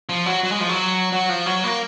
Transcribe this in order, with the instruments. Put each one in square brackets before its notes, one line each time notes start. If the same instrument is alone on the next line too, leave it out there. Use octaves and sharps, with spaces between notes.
[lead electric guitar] F3
F#3
F#3
G#3
F3
F#3
F#3
F3
F#3
A#3